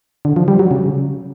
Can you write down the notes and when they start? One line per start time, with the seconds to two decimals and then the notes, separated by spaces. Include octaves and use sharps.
0.25 D3
0.36 F3
0.48 G3
0.59 F#3
0.71 C#3